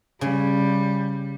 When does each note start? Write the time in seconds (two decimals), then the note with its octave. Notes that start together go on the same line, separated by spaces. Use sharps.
0.21 C#3 G3 G#4